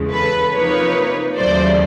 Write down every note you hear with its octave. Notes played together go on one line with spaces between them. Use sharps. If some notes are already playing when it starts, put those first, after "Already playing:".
Already playing: E2 C#3 E3 G#3
A4 B4
C3 F3 A#3 D#4 B4 C#5
D#2 C#3 F#3 A3 C5 D5